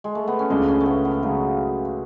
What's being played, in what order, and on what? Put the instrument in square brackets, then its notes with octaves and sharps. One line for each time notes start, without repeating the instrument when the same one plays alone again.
[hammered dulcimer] G#3
A3
B3
C#4
[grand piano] C#2 C#3 G#3 [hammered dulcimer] D4
[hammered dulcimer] C#4
A3
B3
B3
[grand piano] C#3 G#3 [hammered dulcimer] F#3